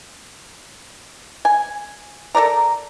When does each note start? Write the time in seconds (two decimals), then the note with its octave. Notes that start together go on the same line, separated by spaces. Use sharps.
1.45 G#5
2.35 A4 A#4 D5 A#5